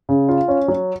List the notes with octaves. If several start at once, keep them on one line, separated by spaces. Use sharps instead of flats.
C#3
F4
C#4
F#3